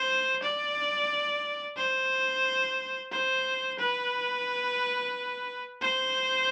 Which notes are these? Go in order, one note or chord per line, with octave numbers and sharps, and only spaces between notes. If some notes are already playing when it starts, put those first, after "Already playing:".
Already playing: C5
D5
C5
C5
B4
C5